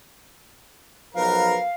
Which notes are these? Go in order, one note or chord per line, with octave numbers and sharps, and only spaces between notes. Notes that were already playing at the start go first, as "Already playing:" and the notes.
B1 F3 A#4 B4 F5